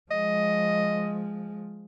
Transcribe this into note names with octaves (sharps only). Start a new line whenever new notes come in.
F3 G#3 D#5